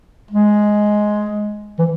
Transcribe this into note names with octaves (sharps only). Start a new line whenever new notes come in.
G#3
E3